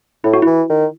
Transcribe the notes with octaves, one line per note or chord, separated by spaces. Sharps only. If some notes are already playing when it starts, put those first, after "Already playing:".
A2 E4
F#4
E3 E4
D#3